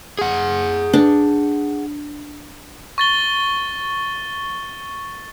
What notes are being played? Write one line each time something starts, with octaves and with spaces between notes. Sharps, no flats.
G#4 F#5
D4
C#6 A6 G7